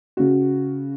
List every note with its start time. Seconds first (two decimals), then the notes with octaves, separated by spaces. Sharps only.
0.17 C#3 F#4